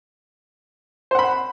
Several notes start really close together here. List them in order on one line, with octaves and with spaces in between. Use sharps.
C5 F#5 B5